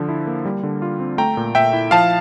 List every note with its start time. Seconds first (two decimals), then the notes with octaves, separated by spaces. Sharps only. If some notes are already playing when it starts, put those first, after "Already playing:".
Already playing: D3 F3
0.09 E4
0.27 A#3
0.45 G3
0.63 D3
0.82 F4
1.00 C4
1.18 A3 G5 A#5
1.37 A#2
1.55 A#2 E5 G5
1.73 E4
1.91 F3 F5 A5